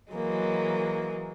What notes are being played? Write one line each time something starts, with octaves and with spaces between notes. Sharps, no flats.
E3 F#3 G#3 A#3